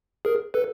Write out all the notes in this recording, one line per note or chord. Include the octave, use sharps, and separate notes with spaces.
G#4 A#4
A4 B4